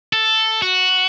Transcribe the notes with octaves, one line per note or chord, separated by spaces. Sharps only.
A4
F#4